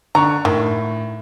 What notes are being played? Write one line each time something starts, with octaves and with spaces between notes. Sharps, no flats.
D3 A#5 C#6
A2 D#3